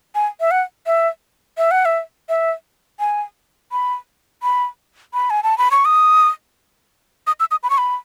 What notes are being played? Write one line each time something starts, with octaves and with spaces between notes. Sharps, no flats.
G#5
E5
F#5
E5
E5
F#5
E5
E5
G#5
B5
B5
B5
G#5
A5
B5
C#6
D#6
D#6
E6
D#6
B5
C#6
B5